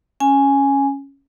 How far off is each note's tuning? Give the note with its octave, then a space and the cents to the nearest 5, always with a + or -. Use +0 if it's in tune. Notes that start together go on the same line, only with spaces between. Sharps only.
C#4 -5 G#5 +0